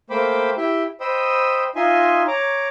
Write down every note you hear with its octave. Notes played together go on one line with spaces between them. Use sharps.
A3 A#3 C5 G5 B5 D6
E4 G4 E5 G5
C5 D#5 G5 B5 D#6 E6
D#4 F4 D#5 E5 G#5 C6
C#5 A#5 D6